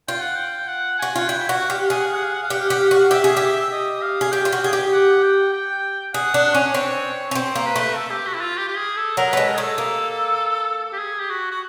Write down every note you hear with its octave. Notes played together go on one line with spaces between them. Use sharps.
F4 G5
F#5
G5
F#5
F#4 G#5
F4 F#5
E4 G5
F#4 F#5
G4 F5
F#5
G#4 F5
F#5
F5
F#5
F5
F#5
F5
G4 F#5
F5
G4 F#5
F5
F#4 F#5
F5
G4 E5
G#4
G4
D#5
F5
G#4
G4 G5
F4
F#4
G#4
G4
F#5
G5
G5
G#4 F#5
D4
C#4
C4 C#5
C#4
C4 C5
A#3
B4
A3
A4
G4
F#4
E4
F4
G4
G4
G#4
A4
F#3 A#4
G#3 A3 B4
A#4
G#4
A3
A4
A#3
G4
G#4
G4
F#4
F#4